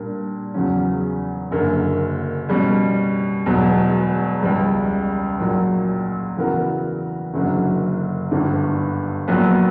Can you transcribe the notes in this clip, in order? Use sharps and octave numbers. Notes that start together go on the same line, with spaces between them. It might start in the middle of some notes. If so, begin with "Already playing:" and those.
Already playing: A#2 G3 A#3 D4
E2 C#3 F#3 C#4
F#1 F#2 D3 A#3
B2 G3 C#4
E1 E2 B2 F#3
C#2 C#3 G3
A#1 A#2 F#3
C#3 E3 B3 F#4 A#4
F#1 F#2 D3 F#3
G1 G2 D3
A#1 A#2 F#3 B3